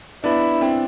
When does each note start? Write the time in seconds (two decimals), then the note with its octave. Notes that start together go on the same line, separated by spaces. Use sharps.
0.24 B3 D4 E4
0.61 C4 E4